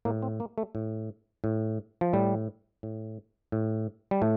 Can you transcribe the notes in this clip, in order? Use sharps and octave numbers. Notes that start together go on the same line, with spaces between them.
A2 A#3
C4
A#3
A3
A2
A2
F3
A2 G3
A2
A2
G3
A2 A3